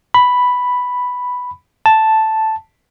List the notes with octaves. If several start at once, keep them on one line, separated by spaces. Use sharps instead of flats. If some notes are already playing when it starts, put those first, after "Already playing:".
B5
A5